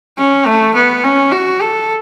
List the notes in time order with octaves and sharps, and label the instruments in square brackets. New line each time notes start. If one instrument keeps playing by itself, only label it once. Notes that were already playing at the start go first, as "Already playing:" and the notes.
[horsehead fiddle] C#4
A3
B3
C#4
F#4
A4